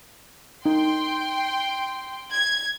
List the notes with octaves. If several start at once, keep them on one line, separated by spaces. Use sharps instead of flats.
D#4 G5 C6
G#6